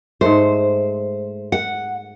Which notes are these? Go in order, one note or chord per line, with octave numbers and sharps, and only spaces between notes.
G#2 A3 C5
F#5